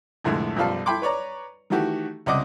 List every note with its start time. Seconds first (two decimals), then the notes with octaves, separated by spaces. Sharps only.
0.24 C2 F2 A2 D3 G#3 A3
0.56 B1 F#2 F3 G3 F5 A5
0.86 E4 A4 G5 B5 C6 D6
1.02 B4 C#5 D5 A#5
1.70 D#3 E3 A3 F#4 G4
2.26 C#2 C3 D5 D#5 F#5 D6